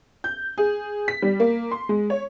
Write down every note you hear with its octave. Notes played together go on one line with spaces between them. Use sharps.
G6
G#4
B6
G3
A#3
C6
G#3
C#5